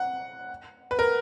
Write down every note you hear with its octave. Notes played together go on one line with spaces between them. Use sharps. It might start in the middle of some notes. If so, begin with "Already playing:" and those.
Already playing: F#5
B4
A#4